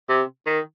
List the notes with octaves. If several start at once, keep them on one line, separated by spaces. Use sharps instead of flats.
C3
D#3